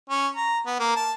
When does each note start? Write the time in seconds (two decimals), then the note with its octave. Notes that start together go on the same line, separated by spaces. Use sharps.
0.10 C#4
0.36 A#5
0.66 B3
0.80 A#3
0.96 A5